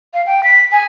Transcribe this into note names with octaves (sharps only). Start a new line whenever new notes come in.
F5
G5
B6
G#5